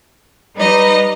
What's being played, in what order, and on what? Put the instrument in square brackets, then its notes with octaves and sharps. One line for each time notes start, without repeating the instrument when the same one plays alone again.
[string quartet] G3 D#4 B4 D#5